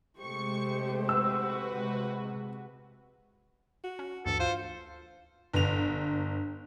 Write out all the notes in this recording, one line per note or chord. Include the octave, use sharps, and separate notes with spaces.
C3 G#3 A3 G4 C5 C#6 C#7
F#4 B4 E6
C3 G#3
F#4
C#4
D2 G2 E3 A4
F4 C5
G1 F7